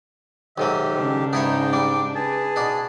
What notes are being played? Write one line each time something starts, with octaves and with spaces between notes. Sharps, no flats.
B1 G#2 D#3 F#3 G4 D#5 E5
C#3 D4
G#2 B3 D#4 E4 C#5 G5
G3 D6
G#4 B4 A5
B2 D4 D#4